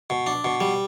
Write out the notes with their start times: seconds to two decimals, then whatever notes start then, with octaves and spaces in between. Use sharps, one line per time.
0.10 B2
0.27 D4
0.44 B2
0.60 G3